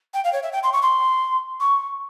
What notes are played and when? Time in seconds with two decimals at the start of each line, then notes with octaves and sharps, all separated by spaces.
0.13 G5
0.24 F5
0.32 C#5
0.43 E5
0.52 G5
0.63 C6
0.72 C#6
0.82 C6
1.60 C#6